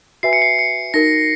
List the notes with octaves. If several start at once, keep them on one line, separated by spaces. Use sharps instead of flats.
F#4 B4 E5 G#5 C7
C#7
C7
C#7
D#4 F#4 A#4 A#6